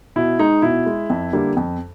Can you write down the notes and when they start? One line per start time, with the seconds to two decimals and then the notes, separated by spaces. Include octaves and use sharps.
0.16 B2 E4
0.39 G#3 D#4
0.62 B2 E4
0.86 G#3
1.10 F2
1.33 D3 G3 A#3
1.56 F2